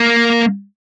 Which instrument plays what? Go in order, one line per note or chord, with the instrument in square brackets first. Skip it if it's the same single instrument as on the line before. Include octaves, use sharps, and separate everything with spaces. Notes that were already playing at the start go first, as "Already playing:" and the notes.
Already playing: [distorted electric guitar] A#3